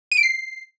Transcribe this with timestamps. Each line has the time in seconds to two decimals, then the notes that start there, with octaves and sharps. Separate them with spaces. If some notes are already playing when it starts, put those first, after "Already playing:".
0.12 D#7
0.17 D7
0.23 C7